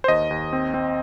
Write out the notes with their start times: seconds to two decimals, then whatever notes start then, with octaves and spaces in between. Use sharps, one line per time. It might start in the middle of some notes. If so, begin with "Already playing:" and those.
0.04 C5
0.08 D#2 D#5
0.31 D#2
0.53 C4
0.74 C4